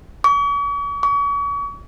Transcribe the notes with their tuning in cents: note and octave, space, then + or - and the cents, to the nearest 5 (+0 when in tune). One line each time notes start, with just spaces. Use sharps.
C#6 +45
C#6 +40